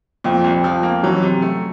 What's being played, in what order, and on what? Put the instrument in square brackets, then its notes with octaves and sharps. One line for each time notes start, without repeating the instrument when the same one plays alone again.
[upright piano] F2 F3 [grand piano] A#2
[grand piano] C2
F3
A#3
[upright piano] F#2 F#3 [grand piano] E3
[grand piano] C3
A3